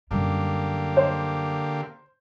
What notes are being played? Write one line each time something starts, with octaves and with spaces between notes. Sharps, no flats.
F#2 D3 G3 A#3 G4
C5